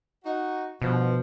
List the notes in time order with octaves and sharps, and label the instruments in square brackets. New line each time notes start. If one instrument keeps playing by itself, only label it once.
[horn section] D#4 F#4
[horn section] G2 F3 [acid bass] B2